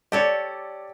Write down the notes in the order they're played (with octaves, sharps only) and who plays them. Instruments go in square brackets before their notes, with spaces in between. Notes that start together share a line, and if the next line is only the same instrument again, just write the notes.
[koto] G4 A4 C#5 [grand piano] D5 C#7